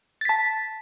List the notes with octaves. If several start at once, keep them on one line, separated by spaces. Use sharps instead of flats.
A5 A6 B6